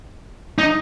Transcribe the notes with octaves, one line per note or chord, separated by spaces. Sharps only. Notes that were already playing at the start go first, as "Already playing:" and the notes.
D#4